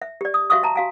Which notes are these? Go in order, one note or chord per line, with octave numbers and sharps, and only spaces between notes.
E5
G4 D5
D#6
F#4 E5 F5 C#6 D#6
E5 A5 A#5
F#4 F5 G#5